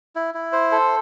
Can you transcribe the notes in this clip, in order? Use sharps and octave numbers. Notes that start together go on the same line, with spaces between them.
E4
E4
C5
A4